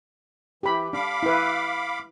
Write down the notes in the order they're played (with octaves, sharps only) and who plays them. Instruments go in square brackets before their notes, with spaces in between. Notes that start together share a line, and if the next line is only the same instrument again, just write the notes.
[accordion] E3 [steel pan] G4 B5
[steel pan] D4 [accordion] F5 B5 D6
[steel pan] E4 B4